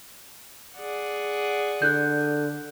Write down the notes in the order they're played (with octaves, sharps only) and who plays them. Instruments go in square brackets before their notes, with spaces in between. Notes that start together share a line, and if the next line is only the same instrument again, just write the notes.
[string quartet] G#4 D5 F#5
[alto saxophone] D3 [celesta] F#6 G6